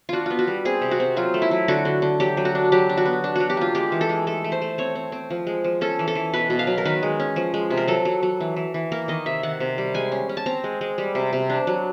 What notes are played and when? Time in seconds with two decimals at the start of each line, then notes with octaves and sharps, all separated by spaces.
0.09 D4 F4 F#4
0.26 B3 F4
0.39 F#4
0.47 G3
0.65 C4 G#4
0.82 C3
0.91 F#4
1.00 C4
1.17 F#3 F4
1.34 A3
1.42 E4
1.51 F#3
1.68 D3 F#4
1.85 D3
2.02 D3
2.20 F#3 G4
2.37 F#3
2.45 F#4
2.55 D4
2.72 F#3 G4
2.89 D4
2.97 F#4
3.05 B3
3.24 D4
3.36 F#3 F#4
3.50 G4
3.57 A#3 F4
3.75 G#3 G4
3.92 E3
4.01 A4
4.09 G#3
4.27 A3 A4
4.44 A3
4.52 C5
4.62 A3
4.78 C4 C#5
4.95 C4
5.12 C4
5.30 F3
5.47 G#3
5.64 F3
5.81 C#4 A4
5.99 E3
6.08 A4
6.15 E3
6.34 B2 B4
6.50 B2
6.59 F5
6.67 F#3
6.78 A#4
6.85 D#3 B4
7.03 G#3
7.20 C#4
7.36 F3
7.54 G#3
7.70 C3
7.77 A#4
7.88 F#3 A4
8.05 F#3
8.23 F#3
8.40 E3
8.56 E3
8.74 E3
8.92 A#3 A#4
9.08 D#3 D#5
9.26 C3 E5
9.43 D#3 F#5
9.60 C3
9.78 G3
9.95 G#3 G#5
10.12 C#4
10.29 C#4
10.37 A5
10.46 C4 A#5
10.64 G#3
10.81 G#3
10.98 G3
11.15 C3
11.33 C3
11.50 D4
11.67 F#3